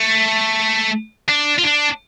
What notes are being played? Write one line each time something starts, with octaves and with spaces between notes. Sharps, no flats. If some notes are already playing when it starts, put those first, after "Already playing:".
Already playing: A3
D4
F4
D4